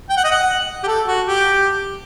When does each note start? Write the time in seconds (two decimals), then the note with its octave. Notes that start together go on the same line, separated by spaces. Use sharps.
0.09 G5
0.17 F#5
0.24 D#5
0.31 F#5
0.83 G4
0.87 A4
1.08 F#4
1.27 G4